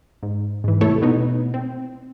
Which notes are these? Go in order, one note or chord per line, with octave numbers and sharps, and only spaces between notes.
G#2
G#2 E3
E2 C3 A3 E4 A4 C#5
B2 B3 D#4
C4